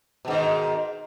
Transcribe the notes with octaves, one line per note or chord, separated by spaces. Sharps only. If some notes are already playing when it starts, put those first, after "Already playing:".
G#2 B2 D#3